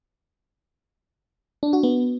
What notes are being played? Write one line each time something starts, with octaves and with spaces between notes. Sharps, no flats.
D4
F#4
B3